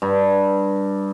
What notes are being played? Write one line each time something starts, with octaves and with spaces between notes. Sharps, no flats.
G2